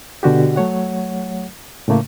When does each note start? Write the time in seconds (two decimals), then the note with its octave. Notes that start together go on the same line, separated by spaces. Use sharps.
0.23 B2 D3 F#4 G4
0.56 F#3 A3 C#5 F#5
1.88 A2 C#3 A3 A#3